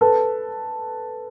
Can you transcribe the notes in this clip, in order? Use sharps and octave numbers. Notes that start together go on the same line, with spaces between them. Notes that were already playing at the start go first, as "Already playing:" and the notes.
A4 B4